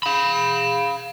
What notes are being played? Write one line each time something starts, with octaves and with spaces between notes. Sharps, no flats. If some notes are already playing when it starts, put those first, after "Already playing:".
F5 B5